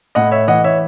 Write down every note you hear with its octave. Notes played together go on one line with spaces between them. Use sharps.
A2 D#5 F#5
C#5 E5
E3 D#5 F#5
C#5 E5